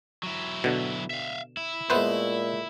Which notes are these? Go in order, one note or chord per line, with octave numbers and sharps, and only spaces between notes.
F#3 E4
B2 D3
E5 F5
E4
A#2 G#3 A3 B3 B4 C5